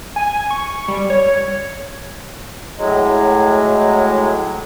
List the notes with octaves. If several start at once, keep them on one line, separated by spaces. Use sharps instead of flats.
G#5
C#6
G3
C#5
A2 F#3 G#3